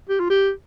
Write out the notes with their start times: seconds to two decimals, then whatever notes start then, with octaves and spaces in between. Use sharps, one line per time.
0.09 G4
0.20 F4
0.30 G4